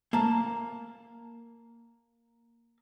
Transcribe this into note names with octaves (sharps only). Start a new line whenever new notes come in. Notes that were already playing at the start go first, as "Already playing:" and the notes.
A#3 A5